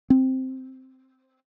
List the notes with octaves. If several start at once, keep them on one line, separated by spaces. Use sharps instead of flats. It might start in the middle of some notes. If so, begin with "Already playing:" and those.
C4